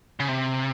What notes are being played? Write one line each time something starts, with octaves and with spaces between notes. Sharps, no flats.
C#3
C3